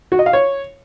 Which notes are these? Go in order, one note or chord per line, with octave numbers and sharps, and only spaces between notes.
F#4
D#5
F5
C#5